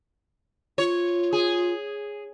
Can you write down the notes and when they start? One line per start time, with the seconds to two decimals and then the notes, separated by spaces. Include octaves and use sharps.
0.78 F4 C#5
1.33 G#4